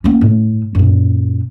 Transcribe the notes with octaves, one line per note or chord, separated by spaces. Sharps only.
A#3 C#4
A2
F#2 A#2